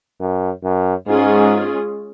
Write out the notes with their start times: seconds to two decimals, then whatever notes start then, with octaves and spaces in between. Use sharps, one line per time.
0.20 F#2
0.64 F#2
1.07 G#2 G#3 C#4 F4 G#4